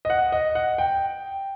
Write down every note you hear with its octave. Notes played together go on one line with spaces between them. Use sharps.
D#5
F#5
D#5
F#5
G5